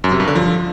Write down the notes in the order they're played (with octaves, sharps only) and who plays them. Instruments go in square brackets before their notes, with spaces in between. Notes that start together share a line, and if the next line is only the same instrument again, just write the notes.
[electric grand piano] F#2
C3
G2
D3
F3